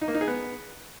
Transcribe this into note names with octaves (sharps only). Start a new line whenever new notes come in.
D#4
A#3
D#4
G#4
B3